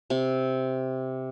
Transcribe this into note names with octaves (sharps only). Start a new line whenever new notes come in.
C3